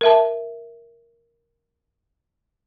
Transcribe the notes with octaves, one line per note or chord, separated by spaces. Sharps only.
A#4 E5 A5